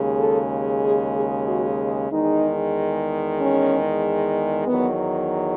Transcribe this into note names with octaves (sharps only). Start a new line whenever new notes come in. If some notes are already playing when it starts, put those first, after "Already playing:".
Already playing: D#2 C#3 G#3
A4
G#4
G#4
F#4
E2 D#3 G#3 D#4
C#4
E2 D#3 F#3 B3